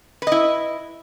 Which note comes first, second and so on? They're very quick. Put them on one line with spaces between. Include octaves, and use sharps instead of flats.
B4 D#5 E4